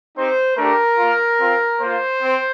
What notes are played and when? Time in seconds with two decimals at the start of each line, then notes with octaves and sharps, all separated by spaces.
0.16 C4 D#4 G4 C5
0.57 A3 D4 G4 A#4
0.98 A#3 F4
1.40 C4 F4
1.81 A#3 F4 C5
2.22 C4